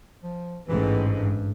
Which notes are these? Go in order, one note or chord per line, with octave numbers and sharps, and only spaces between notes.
F3
A1 G#2 E3
G2